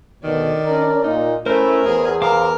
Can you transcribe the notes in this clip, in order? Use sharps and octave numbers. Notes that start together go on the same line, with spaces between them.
D2 B2 D#3 D5
C#4 D4 A#4
A#2 D#4
A3 C#4 E4 A#4 C5
E2 G#4
A#4 C5 F5 D6